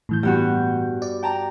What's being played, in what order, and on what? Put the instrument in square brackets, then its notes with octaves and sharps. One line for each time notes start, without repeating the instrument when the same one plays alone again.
[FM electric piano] A2 E3 G6
[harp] G2 B3 F#4
[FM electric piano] D5
[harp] G5 A5 A#5